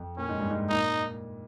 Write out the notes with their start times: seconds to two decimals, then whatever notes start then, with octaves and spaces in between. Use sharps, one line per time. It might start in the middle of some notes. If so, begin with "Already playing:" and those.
Already playing: F2
0.17 A#2 C#4
0.29 G#2
0.39 G2
0.50 G#2
0.70 A#2 D#4